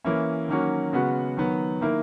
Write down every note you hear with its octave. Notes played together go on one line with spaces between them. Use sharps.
E3 A#3 C#4 E4
D#3 F#3 A#3 C#4 F#4
C#3 G#3 B3 F#4
D#3 F#3 B3
D#3 A#3 E4